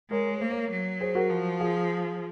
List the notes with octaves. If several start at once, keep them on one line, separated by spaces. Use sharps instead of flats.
G#3 A#4 C#5
C#5
A#3 C5
A#4 C#5
F#3
G#4 C5
F#4 A#4
F3
F4 G#4